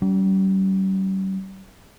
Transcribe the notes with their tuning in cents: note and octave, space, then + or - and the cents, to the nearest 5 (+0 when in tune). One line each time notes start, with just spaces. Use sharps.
G3 -40 C#4 +40